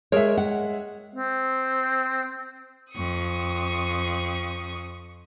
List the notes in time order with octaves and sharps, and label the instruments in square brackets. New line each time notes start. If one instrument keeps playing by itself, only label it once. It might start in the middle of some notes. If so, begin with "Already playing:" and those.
[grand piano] G#3 E5 [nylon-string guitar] A#4 C#5
[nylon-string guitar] F#5
[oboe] C4
[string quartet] F2 C#6 D#6